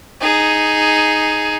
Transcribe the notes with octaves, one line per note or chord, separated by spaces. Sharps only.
D#4 G#4